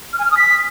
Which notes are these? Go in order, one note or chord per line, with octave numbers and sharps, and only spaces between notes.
F6
G#5
F6
D#6
B6